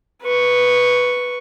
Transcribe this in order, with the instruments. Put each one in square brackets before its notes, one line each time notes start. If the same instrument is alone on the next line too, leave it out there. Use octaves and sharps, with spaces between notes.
[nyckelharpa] B4 C#6